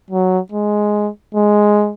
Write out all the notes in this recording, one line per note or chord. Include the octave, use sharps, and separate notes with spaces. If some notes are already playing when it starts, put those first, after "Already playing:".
F#3
G#3
G#3